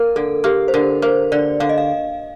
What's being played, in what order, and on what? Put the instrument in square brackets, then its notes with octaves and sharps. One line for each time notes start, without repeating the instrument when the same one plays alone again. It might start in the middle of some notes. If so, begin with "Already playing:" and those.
Already playing: [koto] A#3 [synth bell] A#4
[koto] D3 [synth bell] A4
[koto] A#3 [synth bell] G4
[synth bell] C5
[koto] D3 [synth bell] A#4
[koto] A#3 [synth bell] C5
[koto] D3 [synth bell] D5
[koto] D3 [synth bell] F5
[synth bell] D#5
F5